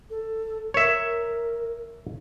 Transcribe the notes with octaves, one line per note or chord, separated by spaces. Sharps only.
A4
A#4 C#5 E5